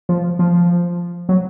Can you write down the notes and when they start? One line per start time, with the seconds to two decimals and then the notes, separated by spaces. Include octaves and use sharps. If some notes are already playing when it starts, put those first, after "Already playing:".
0.09 F3
0.39 F3
1.29 F#3